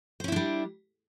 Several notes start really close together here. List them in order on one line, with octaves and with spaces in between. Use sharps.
C5 C#4 E4 D4 G3